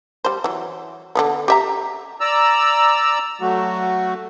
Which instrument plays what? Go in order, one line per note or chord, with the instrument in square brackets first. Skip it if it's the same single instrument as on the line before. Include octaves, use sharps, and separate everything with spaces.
[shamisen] G3 C5
E3 F#3
D3 G#3 B3
G4 E5 A#5
[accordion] D5 A#5 E6
F#3 A3 F#4